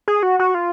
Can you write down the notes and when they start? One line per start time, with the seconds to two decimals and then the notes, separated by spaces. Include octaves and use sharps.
0.08 G#4
0.23 F#4
0.39 F#4
0.55 F4